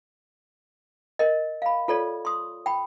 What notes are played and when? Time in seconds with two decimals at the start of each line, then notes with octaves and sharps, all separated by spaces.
1.19 A#4 D#5
1.62 F5 B5
1.88 F4 A4 C#5 D5
2.25 C6 D#6
2.66 G5 B5